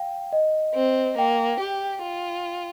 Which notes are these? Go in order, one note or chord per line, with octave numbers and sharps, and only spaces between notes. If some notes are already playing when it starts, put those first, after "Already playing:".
Already playing: F5 G5
D#5
C4
A#3 G5
G4
F4